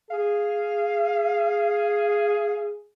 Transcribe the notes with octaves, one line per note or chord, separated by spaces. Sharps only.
G#4 F5